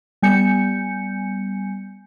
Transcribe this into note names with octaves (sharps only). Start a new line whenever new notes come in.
G3 B3 G#5 G6 C#7